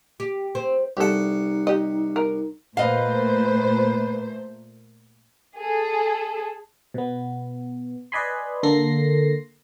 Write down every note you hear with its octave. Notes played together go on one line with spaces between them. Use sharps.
G4
C4
C2 D#4 G4 A4 F#5
G4 D#5
A#4
A#2 A3 B4 C5 D#5 F5
G#4 A4
B2 B3
B4 D5 D#5 G#5 B5 C6
D3 A#3 A4 C6 A#6 C7